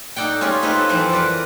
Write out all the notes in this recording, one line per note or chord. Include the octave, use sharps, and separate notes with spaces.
D#4 A4 D5 F#5 G5
C#4 F4 G4 G#4
C4 D#4 F4 A4 B4
F2 E3 C4 C5
A#4 B4 D5 F#5